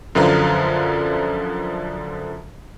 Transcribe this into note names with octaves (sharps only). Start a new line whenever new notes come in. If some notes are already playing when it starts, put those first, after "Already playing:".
F#2 D3 F3 B4 F5 A#5